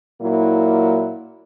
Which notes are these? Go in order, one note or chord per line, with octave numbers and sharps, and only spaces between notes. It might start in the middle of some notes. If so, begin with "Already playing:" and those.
A#2 F#3 A#3 E4